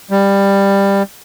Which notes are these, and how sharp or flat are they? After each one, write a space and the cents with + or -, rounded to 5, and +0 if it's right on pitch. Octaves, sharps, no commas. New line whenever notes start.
G3 +15